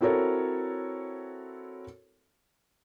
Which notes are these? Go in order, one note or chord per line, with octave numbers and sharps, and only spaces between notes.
C4 E4 F#4 A4 A#4 C#5